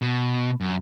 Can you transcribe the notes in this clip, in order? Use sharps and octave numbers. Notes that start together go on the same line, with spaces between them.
B2
F#2